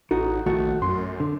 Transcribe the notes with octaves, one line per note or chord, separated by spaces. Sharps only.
A1 D#4 F#4 A4
A#1 D#3 A3 F#4
F#2 C6
D3